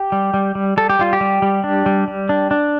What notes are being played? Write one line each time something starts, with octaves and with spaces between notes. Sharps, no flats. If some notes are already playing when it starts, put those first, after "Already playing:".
Already playing: G4
G3
G3
G3
G3 A4
G4
G3 F4
G4
G3
G3
D4
G3
G3
D4
D4